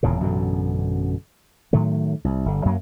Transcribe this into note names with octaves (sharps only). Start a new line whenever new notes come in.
D#1 E2 A#2 C#3
A1 F#2 B2 D3
A2 D#3 F#3 A3
C2
G1 D3
F#2 F#3 A3 A#3